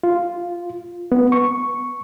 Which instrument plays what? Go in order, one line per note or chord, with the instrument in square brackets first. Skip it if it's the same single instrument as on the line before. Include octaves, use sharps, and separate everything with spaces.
[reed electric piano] F4
B3
C#6